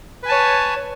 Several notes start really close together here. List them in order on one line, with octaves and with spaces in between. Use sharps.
B4 G#5 A5 C#5